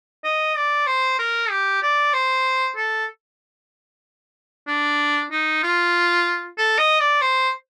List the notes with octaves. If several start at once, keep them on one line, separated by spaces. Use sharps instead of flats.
D#5
D5
C5
A#4
G4
D5
C5
A4
D4
D#4
F4
A4
D#5
D5
C5